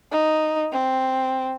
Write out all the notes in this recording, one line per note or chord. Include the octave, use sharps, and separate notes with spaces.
D#4
C4